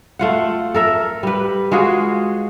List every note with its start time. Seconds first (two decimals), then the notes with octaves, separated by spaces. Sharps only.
0.19 A3 F4 F#5
0.74 A4 A#4 E5
1.23 G3 B4
1.72 G#3 F4 F#4 G#4